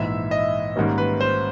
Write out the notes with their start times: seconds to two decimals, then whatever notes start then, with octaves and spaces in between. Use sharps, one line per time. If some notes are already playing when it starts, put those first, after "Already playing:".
Already playing: A#1 G#2 E3 E5
0.31 D#5
0.76 G#2 D#3 G3 A#3 C#4
0.98 B4
1.21 C5